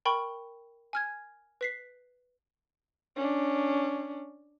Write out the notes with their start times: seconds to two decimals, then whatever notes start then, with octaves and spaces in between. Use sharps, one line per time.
0.05 A#4 G5 B5 C#6
0.93 G#5 F6 G#6
1.61 B4 B6 C7
3.17 C#4 D4